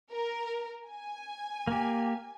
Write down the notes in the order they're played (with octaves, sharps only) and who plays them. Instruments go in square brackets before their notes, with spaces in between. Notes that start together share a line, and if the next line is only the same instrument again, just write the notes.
[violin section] A#4
G#5
[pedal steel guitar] A#3 G4